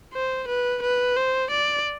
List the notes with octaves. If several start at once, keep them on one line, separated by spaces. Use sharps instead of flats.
C5
B4
B4
C5
D5